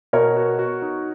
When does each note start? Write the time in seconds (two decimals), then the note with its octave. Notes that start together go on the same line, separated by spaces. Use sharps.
0.13 B2 A#4 C#5
0.36 F#4
0.59 F#4
0.82 D#4